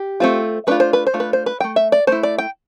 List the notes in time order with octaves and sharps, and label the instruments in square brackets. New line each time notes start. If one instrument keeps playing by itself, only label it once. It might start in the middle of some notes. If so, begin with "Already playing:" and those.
Already playing: [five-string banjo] G4
A3 C4 F4
A3 D4 F4 B4
C5
B4
C5
A3 D4 F4
B4
C5
B4
A3 E4 G5
E5
D5
A3 E4 C5
D5
G5